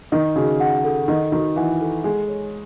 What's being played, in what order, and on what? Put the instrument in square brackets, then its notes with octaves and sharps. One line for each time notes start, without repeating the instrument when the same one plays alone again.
[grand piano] D#3 [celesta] D#5
[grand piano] C#3 [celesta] F#4
[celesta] F#5
A4
[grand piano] D#3 [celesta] D#5
[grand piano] D#3 [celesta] F#4
[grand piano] E3 [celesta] F#5
[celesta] A4
[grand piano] G#3 [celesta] G#5
[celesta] C#5